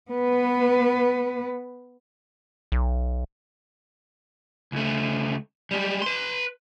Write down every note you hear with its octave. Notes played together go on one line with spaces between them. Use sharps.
B3 B4
B1
C#2 A3
G3 G#3
B4 C6